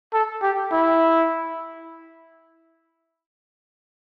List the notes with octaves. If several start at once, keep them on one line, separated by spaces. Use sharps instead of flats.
A4
G4
E4